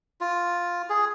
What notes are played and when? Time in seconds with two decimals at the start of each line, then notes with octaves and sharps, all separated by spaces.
0.21 F4
0.90 G#4